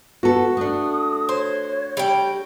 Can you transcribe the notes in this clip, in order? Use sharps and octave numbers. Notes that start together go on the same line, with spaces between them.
B3 F#4 A4
A3 D4 D#6
C5 C#5
G3 G5